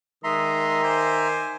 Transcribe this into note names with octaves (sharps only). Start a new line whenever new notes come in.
D#3 G#3 E5 A#5 C6 D#6
C5 G#5 D6